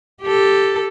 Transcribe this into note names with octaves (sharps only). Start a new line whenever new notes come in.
G4 A4